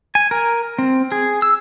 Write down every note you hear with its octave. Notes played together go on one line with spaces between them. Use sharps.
G#5
A#4
C4
G#4
E6